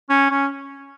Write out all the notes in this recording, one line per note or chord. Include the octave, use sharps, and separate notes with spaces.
C#4
C#4